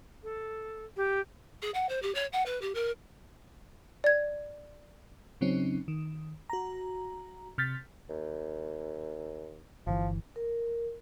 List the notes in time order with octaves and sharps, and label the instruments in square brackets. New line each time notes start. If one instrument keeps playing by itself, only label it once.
[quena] A4
G4
[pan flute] G#4
F#5
C5
G4
C#5
F#5
B4
G4
A#4
[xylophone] D5 G#6
[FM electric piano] C#3 F#3 C4 C#4 D#4
D#3
F#4 A#5
C3 F6 G6 A6 B6
[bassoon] D#2
[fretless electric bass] G1 E3 [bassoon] F3
[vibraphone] A#4